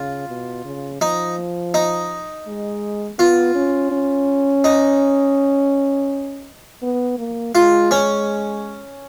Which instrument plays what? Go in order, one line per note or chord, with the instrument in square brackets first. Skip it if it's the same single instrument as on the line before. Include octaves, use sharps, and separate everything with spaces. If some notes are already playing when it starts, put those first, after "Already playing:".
Already playing: [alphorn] C#3 [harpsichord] F4
[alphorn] B2
C#3
[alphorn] F3 [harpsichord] D#4
[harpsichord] D#4
[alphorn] G#3
[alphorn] B3 [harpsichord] F4
[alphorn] C#4
C#4
[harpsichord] D#4
[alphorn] B3
A#3
[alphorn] G#3 [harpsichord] F4
[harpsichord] C#4